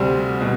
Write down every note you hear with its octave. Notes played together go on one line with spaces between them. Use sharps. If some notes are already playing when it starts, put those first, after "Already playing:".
Already playing: D2 C3 G3 C4 G#5 C6
B2